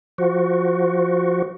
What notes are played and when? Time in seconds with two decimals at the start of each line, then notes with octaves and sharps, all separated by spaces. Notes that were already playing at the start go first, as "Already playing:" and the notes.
0.18 F3 F#4